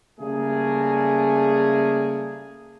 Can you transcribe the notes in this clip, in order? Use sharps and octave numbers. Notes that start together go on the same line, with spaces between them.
C#3 G3 A3 A#3 G#4